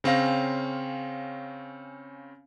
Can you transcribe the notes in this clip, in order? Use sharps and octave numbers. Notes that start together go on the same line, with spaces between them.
C#3 C4 C#4 F5 A#6